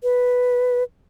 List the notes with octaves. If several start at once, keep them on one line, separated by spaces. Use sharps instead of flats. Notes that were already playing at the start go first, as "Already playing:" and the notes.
B4